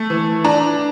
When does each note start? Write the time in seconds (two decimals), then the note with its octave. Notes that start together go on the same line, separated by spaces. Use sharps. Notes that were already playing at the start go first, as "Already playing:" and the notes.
Already playing: A3
0.10 E3
0.44 D4 A#5